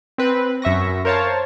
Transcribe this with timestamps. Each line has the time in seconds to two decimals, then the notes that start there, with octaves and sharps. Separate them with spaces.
0.18 C4 B4
0.62 F#2 E5 C#6 A#6
1.05 A#4 C5 C#5 F5 A5